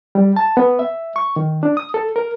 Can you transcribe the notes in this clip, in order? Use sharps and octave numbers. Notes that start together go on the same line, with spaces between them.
G3
A5
B3
E5
C#6
D#3
D4
D#6
A4
A#4